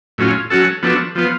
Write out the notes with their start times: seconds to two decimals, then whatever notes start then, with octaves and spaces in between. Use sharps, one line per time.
0.18 A2 F#3 C#4 F4
0.50 F#3 C#4 F#4 A4
0.83 F3 B3 D4 F#4 A4
1.15 F3 B3 F4